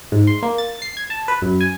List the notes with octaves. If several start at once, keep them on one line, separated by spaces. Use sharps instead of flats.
G#2
C6
A#3
A6
C7
G#6
A5
B4
F#2
G#5